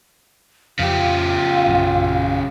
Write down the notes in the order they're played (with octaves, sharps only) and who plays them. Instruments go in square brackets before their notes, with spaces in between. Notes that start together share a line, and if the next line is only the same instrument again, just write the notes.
[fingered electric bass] F2 [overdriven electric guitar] C#3 G4 [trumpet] F4 [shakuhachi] F5
[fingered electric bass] A#1 F#2